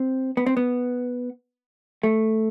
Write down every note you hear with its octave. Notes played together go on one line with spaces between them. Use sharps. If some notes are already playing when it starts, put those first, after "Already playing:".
Already playing: C4
B3
C4
B3
A3